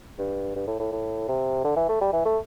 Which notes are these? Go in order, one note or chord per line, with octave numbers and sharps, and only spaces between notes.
G2
G2
A2
A2
A2
C3
D3
E3
A3
G3
E3
A3